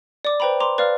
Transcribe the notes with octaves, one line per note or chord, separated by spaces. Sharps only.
D5 D6
B4 C5 G5 A#5 B5
A#5 C6 D6
B4 D5 F5 F6